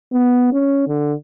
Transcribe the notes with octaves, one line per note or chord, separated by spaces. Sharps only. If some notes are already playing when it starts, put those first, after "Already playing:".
B3
C#4
D3